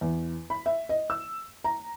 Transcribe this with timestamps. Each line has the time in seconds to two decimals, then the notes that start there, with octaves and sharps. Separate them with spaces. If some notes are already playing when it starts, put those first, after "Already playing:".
0.01 E2
0.50 B5
0.66 E5
0.89 D#5
1.10 E6
1.64 A#5